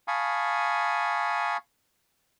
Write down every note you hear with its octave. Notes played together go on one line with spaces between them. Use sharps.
F5 G#5 A5 B5 C#6 D#6